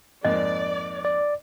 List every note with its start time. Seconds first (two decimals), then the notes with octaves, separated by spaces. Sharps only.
0.25 F2 G#2 A#3 D5 D#5
1.05 D5